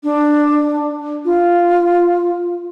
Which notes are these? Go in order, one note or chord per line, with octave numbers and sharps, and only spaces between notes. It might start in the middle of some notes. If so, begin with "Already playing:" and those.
D4
F4